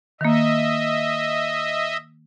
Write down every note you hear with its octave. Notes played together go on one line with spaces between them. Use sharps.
D#3 A#3 D#5 E5